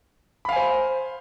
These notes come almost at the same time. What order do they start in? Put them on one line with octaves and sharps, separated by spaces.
B5 F5 G#5 C5